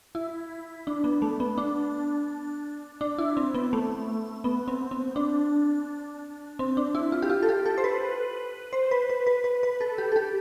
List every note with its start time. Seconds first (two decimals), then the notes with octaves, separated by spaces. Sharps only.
0.15 E4
0.87 D4
1.04 B3
1.22 A3
1.40 B3
1.58 D4
3.01 D4
3.18 E4
3.37 C4
3.54 B3
3.73 A3
4.44 B3
4.68 C4
4.91 C4
5.16 D4
6.59 C4
6.77 D4
6.95 E4
7.12 F4
7.22 G4
7.30 F4
7.43 A4
7.49 G4
7.66 A4
7.78 C5
7.84 B4
8.73 C5
8.91 B4
9.10 B4
9.27 B4
9.44 B4
9.63 B4
9.81 A4
9.98 G4
10.12 A4
10.16 G4